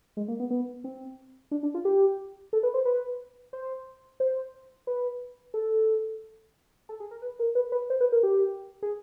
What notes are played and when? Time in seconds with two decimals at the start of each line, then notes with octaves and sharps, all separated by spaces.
0.17 G#3
0.28 A#3
0.40 B3
0.50 B3
0.84 C4
1.51 D4
1.63 D4
1.74 F4
1.85 G4
2.53 A4
2.63 B4
2.74 C5
2.85 B4
3.53 C5
4.20 C5
4.87 B4
5.54 A4
6.89 A4
7.00 G#4
7.11 A#4
7.22 B4
7.39 A#4
7.55 B4
7.72 B4
7.90 C5
8.01 B4
8.12 A#4
8.23 G4
8.82 G#4